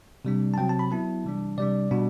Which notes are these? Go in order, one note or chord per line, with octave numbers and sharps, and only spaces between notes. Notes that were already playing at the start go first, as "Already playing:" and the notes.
C3 G3 D4
A5
C3 F#3 C4 G5
A5
B5
F#3 B3 E4 A5
C3 E3 G3 D4
C3 G3 D4 D5
B2 G3 D4